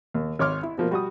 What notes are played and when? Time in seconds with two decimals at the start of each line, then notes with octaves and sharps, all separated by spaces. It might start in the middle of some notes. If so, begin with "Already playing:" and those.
0.14 D#2
0.39 G#1 C#5 C6 D6 F6
0.63 E4
0.78 B2 F3 A#3
0.91 G3 F#4 D#6